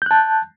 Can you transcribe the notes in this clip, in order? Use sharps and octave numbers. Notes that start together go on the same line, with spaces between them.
A5 F#6 G6